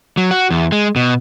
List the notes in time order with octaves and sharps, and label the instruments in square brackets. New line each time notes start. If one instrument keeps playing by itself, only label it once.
[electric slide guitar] F#3
F#4
E2
G#3
B2